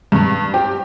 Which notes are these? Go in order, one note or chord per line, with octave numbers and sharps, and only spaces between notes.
G2
G4